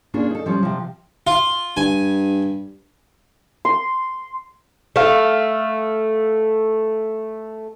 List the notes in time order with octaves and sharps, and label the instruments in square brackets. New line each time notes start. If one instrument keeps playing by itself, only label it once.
[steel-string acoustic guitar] A#3 C#4 D4 F4 G#4
D#4 A4
F3 G3 C#4
C3 F3
[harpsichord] F4
[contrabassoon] G2 [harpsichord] G#5
[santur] C6
[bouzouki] A3 F5